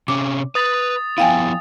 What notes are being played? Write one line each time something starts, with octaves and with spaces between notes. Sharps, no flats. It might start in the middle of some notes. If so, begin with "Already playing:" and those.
C3 C#4 D6
B4 D#6 A6
F3 B3 E4 F5 G5 G#5